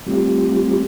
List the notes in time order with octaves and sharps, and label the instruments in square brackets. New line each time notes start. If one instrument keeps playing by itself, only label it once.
[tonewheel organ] G3 A3 C4 F4 G4